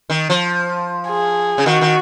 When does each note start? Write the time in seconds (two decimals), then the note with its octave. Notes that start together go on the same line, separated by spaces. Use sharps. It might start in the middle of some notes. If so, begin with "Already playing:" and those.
0.10 D#3
0.30 F3
1.08 G#4
1.58 C#3
1.66 D#3 F#4
1.81 D#3